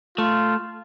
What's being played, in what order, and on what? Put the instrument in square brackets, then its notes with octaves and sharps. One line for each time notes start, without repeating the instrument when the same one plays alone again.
[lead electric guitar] A3 [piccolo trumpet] F4